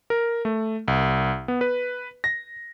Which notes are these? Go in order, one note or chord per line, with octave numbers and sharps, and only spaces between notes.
A#4
A3
C2
B3
B4
A#6